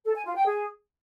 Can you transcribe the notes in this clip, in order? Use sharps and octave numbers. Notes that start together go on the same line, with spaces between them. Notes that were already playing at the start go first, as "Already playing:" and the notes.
A4
G#5
F4
G5
G#4